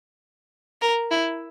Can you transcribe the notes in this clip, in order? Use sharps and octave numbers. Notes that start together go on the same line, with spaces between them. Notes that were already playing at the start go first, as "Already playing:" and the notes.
A#4
E4